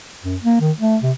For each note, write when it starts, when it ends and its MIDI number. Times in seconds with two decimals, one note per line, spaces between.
0.24 0.37 42
0.43 0.58 58
0.61 0.72 51
0.79 0.97 57
1.02 1.12 48